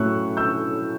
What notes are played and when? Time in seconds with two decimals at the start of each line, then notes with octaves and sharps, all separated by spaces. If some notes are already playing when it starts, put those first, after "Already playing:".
Already playing: A2 F#3 A3 C#4 C#6 E6 F#6
0.37 E6 G6